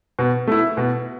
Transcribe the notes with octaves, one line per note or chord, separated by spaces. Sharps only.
B2
A3 E4
B2